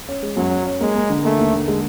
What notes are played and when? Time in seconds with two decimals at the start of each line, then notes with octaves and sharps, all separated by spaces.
0.09 C#4
0.23 G#3
0.36 F#2 F#3
0.51 C#4
0.67 C#4
0.81 G#3 A#3
0.95 A#3
1.10 D3
1.24 A3 A#3
1.39 D#2
1.53 D3
1.68 G#3